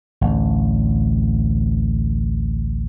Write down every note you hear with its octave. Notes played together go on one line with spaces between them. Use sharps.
A1 D2